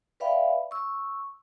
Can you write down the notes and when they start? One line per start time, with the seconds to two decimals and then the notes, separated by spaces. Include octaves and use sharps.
0.20 B4 D5 E5 F5 G5 B5
0.71 C#6 E6